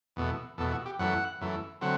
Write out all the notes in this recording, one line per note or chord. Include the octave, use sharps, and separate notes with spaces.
E2 B2 A3
E2 B2 A3 A4
F#4
G4
F#2 E3 A3 F#5
F#2 E3 A3
D3 F#3 A3 C4 F#5